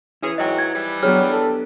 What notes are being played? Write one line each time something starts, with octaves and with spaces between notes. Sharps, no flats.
C#4 E4 G#4 B4
G#2 F#3 D#5 G5
G#6
E3 F3 G3
F#3 B3 D4 G4 G#4 C#5 F6
A4